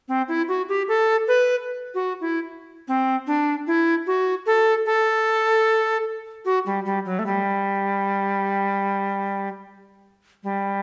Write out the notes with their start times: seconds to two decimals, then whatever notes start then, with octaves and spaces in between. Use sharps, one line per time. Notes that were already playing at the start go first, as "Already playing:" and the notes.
0.08 C4
0.28 E4
0.48 F#4
0.69 G4
0.88 A4
1.28 B4
1.95 F#4
2.21 E4
2.88 C4
3.27 D4
3.67 E4
4.07 F#4
4.46 A4
4.86 A4
6.45 F#4
6.66 G3
6.85 G3
7.05 F#3
7.19 A3
7.26 G3
10.44 G3